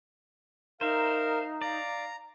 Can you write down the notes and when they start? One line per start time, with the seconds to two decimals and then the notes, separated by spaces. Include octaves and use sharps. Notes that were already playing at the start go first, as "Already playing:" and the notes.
0.81 D#4 A#4 C5 E5 F5
1.62 D5 F5 A#5